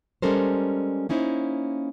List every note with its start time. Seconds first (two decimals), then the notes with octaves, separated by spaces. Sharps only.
0.22 G3 G#3 C#4 A4 A#4 C5
1.09 A#3 C#4 D#4 E4 C5